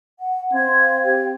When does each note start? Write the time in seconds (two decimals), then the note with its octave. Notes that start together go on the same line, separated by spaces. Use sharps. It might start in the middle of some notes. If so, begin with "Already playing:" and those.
0.19 F#5
0.53 C4 F5 C6 G#6
1.03 G4 C5 G5